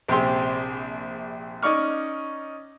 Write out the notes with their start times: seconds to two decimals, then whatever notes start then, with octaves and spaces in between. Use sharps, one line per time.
0.08 A#1 C3 C4 G4 G#4 C6
1.63 C#4 D#4 D5 C#6 F6